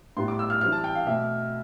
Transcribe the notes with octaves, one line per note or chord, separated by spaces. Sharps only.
A2 G3 B3 C6
D6
E6
F6
E3 G3 C4 F6
A5
G5
F5
B2 A3 C4 E5